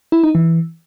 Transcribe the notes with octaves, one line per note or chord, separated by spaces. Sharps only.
E4
D#4
E3